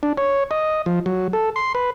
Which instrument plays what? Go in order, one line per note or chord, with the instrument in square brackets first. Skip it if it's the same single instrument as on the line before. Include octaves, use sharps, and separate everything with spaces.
[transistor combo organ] D4
C#5
D#5
F3
F#3
A4
C6
B4